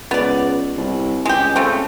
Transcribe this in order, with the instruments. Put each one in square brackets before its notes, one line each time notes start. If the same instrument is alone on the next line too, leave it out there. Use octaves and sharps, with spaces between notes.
[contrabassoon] C#2 [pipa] B3 D5
[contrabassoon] C2
[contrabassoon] C#2 [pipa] G#3 G4
[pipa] C#3 A3 C4